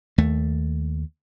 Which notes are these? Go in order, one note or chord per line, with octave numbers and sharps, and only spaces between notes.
D#2 A3